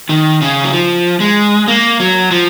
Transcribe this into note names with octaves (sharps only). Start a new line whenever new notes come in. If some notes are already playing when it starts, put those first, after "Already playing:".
D#3
C#3
F#3
F3
G#3
A#3
F#3
F3